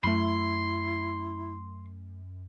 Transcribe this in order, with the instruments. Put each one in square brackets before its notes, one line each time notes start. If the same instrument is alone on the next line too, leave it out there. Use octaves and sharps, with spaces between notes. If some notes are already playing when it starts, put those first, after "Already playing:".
[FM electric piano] F#2 [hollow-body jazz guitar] A3 B5 [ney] E4 [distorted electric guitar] C6